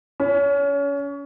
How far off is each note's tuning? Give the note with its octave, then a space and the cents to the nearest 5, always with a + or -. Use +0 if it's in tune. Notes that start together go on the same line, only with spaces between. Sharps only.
C#4 +30